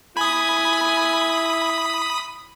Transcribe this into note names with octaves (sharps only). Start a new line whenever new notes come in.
E4 G#5 B5 D#6